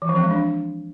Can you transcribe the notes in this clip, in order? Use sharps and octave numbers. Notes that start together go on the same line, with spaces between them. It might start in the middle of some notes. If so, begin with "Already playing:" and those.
E3
F3
C4
G#3
D4